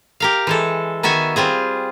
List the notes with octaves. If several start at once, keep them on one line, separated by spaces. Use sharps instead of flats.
G4 A#4 F5
E3 G#3 A4
D#3 B3 F#4 E5 G#5
G3 C4 F4 G#4